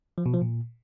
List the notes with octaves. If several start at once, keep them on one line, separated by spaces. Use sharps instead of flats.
F3
B2
F3
A#2